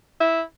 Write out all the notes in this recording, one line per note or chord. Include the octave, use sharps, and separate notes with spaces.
E4